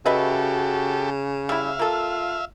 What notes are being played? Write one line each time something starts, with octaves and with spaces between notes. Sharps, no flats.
C#3 F#4 G4 A4 B4 D#5 E5
G3 E4 E5 F5
A#3 F4 A4